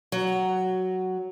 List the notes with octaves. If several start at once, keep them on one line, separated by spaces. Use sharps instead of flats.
F#3